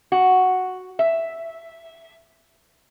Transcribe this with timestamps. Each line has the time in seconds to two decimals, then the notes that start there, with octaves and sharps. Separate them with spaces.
0.12 F#4
0.99 E5